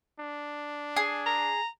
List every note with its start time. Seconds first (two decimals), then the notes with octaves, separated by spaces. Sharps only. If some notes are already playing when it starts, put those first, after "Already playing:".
0.19 D4
0.96 G#4
1.26 A#5